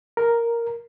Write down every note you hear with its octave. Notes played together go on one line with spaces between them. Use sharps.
A#4